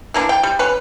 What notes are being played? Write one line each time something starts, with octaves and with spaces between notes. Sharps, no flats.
E3 A#3 D4
G5
G3
C#4 B4